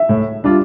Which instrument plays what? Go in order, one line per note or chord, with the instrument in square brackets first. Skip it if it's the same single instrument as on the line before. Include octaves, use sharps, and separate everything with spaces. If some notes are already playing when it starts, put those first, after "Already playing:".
Already playing: [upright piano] E5
[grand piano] A2
G3 D4 F4